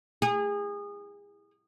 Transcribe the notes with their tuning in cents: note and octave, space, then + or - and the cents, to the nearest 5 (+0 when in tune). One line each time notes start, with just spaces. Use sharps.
G#4 -30